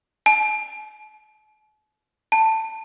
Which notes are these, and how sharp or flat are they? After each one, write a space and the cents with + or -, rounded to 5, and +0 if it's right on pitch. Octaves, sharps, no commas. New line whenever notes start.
A5 -45
A5 +15